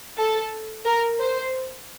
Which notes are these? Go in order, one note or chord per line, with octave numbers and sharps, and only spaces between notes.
A4
A#4
C5